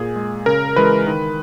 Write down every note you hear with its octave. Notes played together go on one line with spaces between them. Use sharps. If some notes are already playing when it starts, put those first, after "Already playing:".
Already playing: A#2 G#4
G#3
C#3 A#4
E3 G#3 B4
D#3